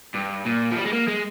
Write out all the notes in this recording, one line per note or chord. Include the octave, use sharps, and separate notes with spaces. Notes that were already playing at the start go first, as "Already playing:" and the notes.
G2
A#2
F3
G3
G#3
A#3
G#3